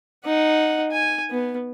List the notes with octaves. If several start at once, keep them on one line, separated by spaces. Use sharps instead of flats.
D#4 F#5
G#5
B3